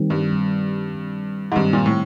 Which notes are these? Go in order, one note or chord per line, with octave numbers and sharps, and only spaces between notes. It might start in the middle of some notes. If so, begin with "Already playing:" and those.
Already playing: D#3 G3 C4
G2
D#3 G3 C4
D#3 G3 C4
G#2
G2 D#3 G3 C4
A#2
A2